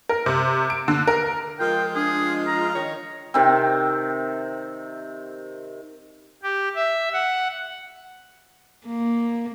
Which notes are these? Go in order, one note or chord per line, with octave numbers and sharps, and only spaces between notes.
A#4
C3
D7
D3
A#4
F3 G#3 F4 A#4 G5
D4 G#4
A#5
D#3 C#5
C3 D#3 C4
G4
E5
F#5
A#3